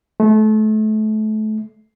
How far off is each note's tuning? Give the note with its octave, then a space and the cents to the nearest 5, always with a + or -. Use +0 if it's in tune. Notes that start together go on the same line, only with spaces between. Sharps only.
A3 -30